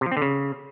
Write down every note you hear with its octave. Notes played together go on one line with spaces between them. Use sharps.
C3
F3
C4
D3
C#3